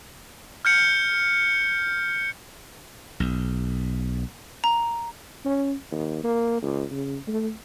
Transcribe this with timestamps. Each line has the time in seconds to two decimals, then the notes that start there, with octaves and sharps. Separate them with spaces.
0.65 F6 G6 C#7
3.20 B1
4.64 A#5
5.45 C#4
5.91 D#2
6.23 A#3
6.62 C#2
6.91 C#3
7.27 A3